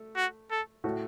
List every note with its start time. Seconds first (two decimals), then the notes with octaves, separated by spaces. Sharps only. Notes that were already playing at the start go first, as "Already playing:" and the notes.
Already playing: A3
0.16 F#4
0.51 A4
0.84 A2 A3 F#4